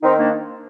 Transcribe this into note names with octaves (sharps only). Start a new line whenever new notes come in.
D#3 C4 D#4
A#3 D4